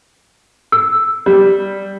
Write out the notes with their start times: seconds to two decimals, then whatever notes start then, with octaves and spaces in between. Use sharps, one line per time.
0.72 E6
1.26 G3